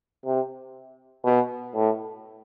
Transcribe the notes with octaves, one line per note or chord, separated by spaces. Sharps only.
C3
B2
A2